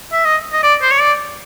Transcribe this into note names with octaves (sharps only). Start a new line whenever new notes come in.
E5
D#5
D#5
D5
C5
C#5
D5